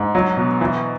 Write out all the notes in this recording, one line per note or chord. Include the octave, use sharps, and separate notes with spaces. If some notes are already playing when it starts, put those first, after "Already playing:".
Already playing: G#2
F#3
B2
E3